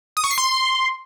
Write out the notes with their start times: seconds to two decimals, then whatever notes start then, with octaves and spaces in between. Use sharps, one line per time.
0.17 D#6
0.24 C#6
0.31 C7
0.38 C6